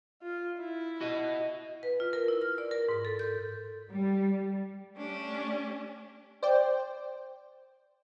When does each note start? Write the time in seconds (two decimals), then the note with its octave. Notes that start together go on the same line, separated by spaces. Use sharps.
0.22 F4
0.59 E4
1.01 F#4 D#5
1.83 B4
2.00 F4
2.13 A#4
2.28 E4
2.42 F6
2.58 D5
2.71 A#4
2.88 G#2
3.05 A4
3.19 G6
3.88 G3
4.95 A3 C#4 D4 G4
6.43 C5 D5 G5